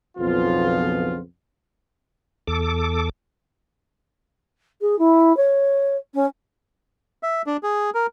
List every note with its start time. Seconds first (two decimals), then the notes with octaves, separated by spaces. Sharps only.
0.18 B1 F2 C#3 F3 B3 F4
2.47 E2 A4 D6
4.81 G#4
4.99 E4
5.37 C#5
6.14 C#4
7.23 E5
7.46 D4
7.63 G#4
7.94 A#4